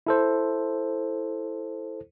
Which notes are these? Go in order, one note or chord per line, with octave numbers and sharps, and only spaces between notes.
E4 A4 C5